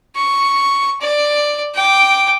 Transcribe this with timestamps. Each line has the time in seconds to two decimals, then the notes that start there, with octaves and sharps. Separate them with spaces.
0.15 C#6
1.01 D5
1.74 G5 D6